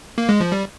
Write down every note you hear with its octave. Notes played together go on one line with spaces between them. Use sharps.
A#3
G#3
F3
G3